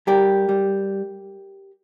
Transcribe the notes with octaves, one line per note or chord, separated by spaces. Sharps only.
G3 G4 A#4
G3